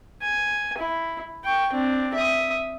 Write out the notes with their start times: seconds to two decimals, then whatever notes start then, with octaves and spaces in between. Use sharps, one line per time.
0.22 G#5
0.79 E4
1.45 G5 C#6
1.73 C4 D4
2.14 E5 D#6